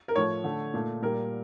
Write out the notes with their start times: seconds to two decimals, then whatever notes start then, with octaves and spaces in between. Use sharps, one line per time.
0.08 A#4
0.15 A2 F3 A3 C#5
0.44 D3 A3
0.74 A#2 A3
1.02 A#2 G3 A#4